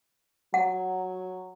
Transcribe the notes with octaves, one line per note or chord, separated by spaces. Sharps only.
F#3 F#5